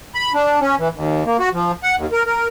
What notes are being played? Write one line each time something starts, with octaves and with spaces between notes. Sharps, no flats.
B5
D4
C#4
E3
D#2
A#3
F#4
F3
F#5
D#2
A#4
A#4